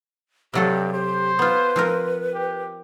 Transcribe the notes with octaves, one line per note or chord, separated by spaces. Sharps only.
G2 C3 F#3 G4 A4
G4 C5
B3 F4 B4
F3 C4 A#4
G4